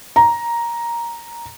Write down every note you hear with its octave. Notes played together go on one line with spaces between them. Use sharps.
A#5